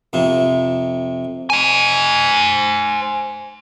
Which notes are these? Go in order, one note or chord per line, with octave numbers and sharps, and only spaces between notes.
F2 C3
C5 G#5